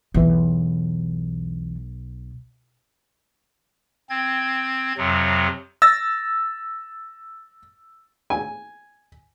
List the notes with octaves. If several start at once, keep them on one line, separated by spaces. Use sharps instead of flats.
B1 E2 E3
C4 G#6
F2 C3 F#3
E6 A6 A#6
G#5